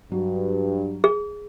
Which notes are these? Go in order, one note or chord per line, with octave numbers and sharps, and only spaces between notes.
G2 F#3
G#4